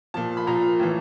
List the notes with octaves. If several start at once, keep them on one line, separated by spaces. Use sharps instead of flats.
A#2 F3 A5
B5
A#2 F3 A#5
A2 E3